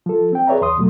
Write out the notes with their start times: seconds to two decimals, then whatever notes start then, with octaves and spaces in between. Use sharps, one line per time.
0.06 F3 A4
0.33 C4 G5
0.47 G#4 B4 C#5 D5 E5 A#5
0.61 E2 C6 D#6
0.76 C2 B2 F#3 A3